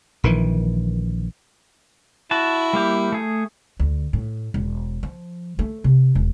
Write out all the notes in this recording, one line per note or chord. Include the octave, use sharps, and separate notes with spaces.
A#1 D#3 E3
E4 F#4 A5
G3 A#3 G4
A3 G#4
D2
A2
E1
F3
A3
C3
E1